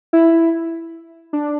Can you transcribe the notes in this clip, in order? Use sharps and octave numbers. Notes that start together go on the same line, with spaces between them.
E4
D4